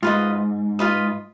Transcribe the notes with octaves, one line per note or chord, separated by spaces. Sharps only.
G#2 F4 B4 D#5
F4 B4 D#5